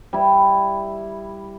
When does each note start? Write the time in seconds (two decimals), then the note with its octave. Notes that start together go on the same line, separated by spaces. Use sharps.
0.13 G3 E4